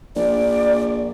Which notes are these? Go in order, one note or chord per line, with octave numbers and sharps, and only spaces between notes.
A#1 D5